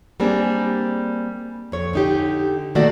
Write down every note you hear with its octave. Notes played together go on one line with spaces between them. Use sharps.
G3 A#3 C4 D4 G#4
F2 C#5
D3 D#4 G4
B2 D#3 A3 A#3 F#4 D5